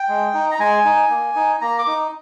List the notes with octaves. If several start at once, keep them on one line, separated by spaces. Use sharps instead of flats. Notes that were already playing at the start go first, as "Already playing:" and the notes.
Already playing: G5
G#3
D#4
A#5
G#3 G#5
D#4
A#3
D#4
A#3 A#5
D6
D#4